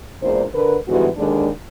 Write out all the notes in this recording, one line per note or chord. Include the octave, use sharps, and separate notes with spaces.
E2 A#2 G#3 D4 A#4 C5
D3 A#4 B4
G#2 D3 E3 G3 B3 F#4
D#2 D3 D#3 G#3 D4